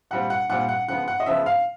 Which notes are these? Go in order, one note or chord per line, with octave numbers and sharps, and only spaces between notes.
A#2 G3 C4 F#5
F#5
A#2 G3 C4 F#5
F#5
C#3 F3 G#3 B3 F#5
F#5
D#5
C#3 F3 G#3 B3 E5
F5